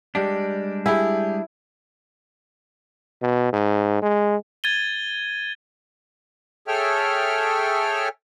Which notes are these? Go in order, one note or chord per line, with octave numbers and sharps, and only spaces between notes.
G3 G#3 D4 G4
E4 G4 G#4
B2
G#2
G#3
G#6 A6 D#7 G7
G#4 A4 C#5 E5 G5 F6